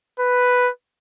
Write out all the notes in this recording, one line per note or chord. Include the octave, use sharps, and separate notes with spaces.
B4